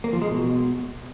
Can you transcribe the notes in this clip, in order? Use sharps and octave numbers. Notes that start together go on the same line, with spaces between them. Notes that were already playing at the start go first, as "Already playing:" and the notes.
A#3
F3
G#3
B2